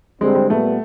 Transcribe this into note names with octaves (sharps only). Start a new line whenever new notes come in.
D3 G3 G#3 C4
G#3
A#2 G3 A3 B3